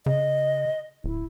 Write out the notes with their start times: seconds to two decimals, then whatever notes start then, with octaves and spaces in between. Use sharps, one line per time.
0.06 C#3 D#5
1.04 D1 E4